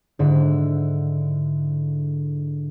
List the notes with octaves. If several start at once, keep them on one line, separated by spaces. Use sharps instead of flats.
G#2 D3 E4